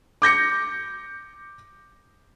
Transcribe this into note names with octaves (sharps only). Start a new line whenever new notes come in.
D6 G6 A#6 C#7